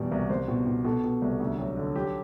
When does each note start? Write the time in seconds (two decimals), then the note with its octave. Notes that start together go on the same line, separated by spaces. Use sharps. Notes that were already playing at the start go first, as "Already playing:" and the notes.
Already playing: E2 B2 G3 D5
0.12 C2
0.30 C2 C5
0.48 B2
0.66 B2
0.84 B2 A4
1.04 B2
1.22 C2
1.40 D2
1.58 F#3
1.77 D3
1.96 F#3 G4